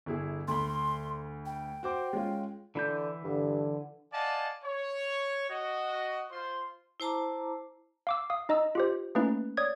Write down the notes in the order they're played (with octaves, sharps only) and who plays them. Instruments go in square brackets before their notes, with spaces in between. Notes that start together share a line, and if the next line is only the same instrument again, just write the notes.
[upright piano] G1 E4 G#4
[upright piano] D2 B5 [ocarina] C6
[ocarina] G5
[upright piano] F#4 C5 D6
G#3 C#4 F4
[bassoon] D3 [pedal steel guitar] E3 E4 G6
[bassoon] G2 [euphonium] D3
[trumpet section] D5 D#5 F5 F#5 G#5 A5
C#5
F#4 D#5
F4 C5 C6
[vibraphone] E4 C5 A5 A#5 D6
[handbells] F5 D6 E6
F5 D#6
D#4 D#5 A#5 E6
F4 G4 C5
A3 A#3 C#4 D#4 E4 B4
C#5 D5 D#6 G#6